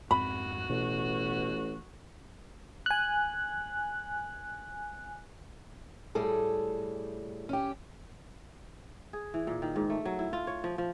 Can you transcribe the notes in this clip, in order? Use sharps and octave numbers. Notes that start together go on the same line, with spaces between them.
F2 G#2 C4 F#4 B5
A1 B2
G#5 F#6
A2 G3 G#4 A4
C#4 G4
G#4
E3
A#2
D#3
G#2
A3
F#3
E4
F4
C#5
F3
F3